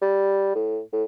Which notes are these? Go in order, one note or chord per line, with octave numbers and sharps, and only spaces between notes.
G3
A2
A2